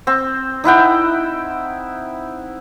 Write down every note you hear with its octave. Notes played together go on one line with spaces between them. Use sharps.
C4
D#4 E4 F#5 G5